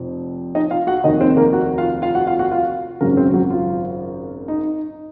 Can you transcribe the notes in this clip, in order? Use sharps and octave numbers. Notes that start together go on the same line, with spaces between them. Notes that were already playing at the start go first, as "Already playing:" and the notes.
Already playing: F1 F2
D#4 D#5
F4 F5
F#4 F#5
F1 D#2 D#3 D#4 D#5
C4 C5
A#3 A#4
F#4 F#5
F4 F5
F4 F5
F#4 F#5
F4 F5
F#4 F#5
F4 F5
G#1 F#2 C#3 F#3 A#3 A#4
C4 C5
F#3 F#4
F4
D#4